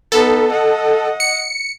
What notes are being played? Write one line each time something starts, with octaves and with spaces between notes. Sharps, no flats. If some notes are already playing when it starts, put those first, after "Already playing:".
B3 D#4 A4
D#5 F#5
C#7